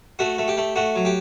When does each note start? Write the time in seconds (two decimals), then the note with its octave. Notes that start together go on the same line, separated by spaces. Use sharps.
0.19 A3 F#4
0.38 A3
0.48 G4
0.57 A3
0.76 A3 F#4
0.96 F#3
1.05 G4